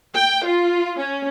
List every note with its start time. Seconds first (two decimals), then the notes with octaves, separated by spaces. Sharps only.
0.15 G5
0.45 F4
0.97 C#4